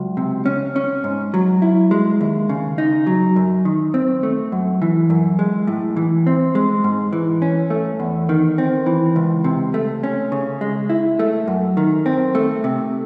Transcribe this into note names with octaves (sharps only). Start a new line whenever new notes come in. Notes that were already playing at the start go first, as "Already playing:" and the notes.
Already playing: C#2 F#3
C3
C#4
C#4
G#2
F#3
E4
G#3
D#2
C#3
D#4
F#3
F#2
D#3
C4
A3
F#2
E3
F#2
G#3
A2
E3
C4
G#3
G#2
E3
C#4
A3
E2
D#3
C4
E3
C#2
C3
A3
C#4
C#3
G#3
E4
A3
F#2
D#3
C4
A3
C3